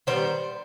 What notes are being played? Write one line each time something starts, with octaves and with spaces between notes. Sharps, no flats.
D#3 G3 B3 C5